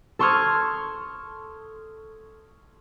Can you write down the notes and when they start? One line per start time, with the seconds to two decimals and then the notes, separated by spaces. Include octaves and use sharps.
0.19 A4 C6 C#6 D#6 F6 G#6